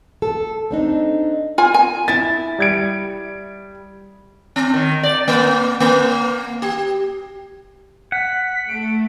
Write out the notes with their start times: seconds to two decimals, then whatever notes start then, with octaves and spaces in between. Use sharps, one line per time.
0.22 A4
0.71 C4 D4 D#4
1.58 F4 G#5
1.74 G#5
2.08 E4 E5 A6
2.59 G3 G#6 D7
4.56 C4
4.74 D#3
5.03 D5
5.28 A#3
5.80 A#3
6.62 G4
8.12 F#5 B6
8.68 A3 D7